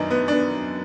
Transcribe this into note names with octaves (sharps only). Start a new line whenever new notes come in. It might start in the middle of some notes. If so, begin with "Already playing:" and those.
Already playing: F#2 D#3 B3 D4 D#4
B3
D4
B3